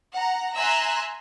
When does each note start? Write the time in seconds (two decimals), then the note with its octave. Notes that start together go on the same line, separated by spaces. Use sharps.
0.14 F#5 A#5
0.55 E5 G#5 A#5 C6 E6 F#6